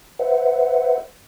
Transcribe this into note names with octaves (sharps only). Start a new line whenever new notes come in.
B4 C5 E5 F#5